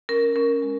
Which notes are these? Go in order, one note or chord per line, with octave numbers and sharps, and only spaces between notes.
C#4 A#4
C#4 A#4
G#3